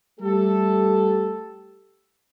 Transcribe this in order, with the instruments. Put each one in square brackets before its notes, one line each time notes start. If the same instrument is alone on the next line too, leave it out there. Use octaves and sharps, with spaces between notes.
[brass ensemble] G3 A3 G4 A4